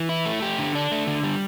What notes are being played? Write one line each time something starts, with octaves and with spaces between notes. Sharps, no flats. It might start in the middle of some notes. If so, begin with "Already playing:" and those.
Already playing: E3
E4
A3
G4
D3
D4
A3
D3
G3